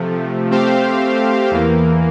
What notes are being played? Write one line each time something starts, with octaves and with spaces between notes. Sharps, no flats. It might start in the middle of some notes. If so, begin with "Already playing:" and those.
Already playing: C3 F3 A3
A3 C4 G4 C5 F5
E2 E3 A#3